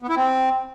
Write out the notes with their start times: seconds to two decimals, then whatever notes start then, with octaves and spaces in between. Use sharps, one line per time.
0.02 B3
0.09 E4
0.17 C4